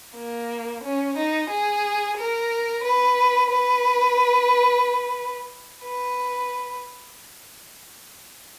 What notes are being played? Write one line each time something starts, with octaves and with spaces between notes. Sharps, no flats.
A#3
C#4
D#4
G#4
A#4
B4
B4
B4